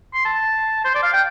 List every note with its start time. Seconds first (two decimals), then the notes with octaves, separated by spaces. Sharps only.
0.14 C6
0.25 A5
0.85 C5
0.95 D5
1.03 F5
1.13 G5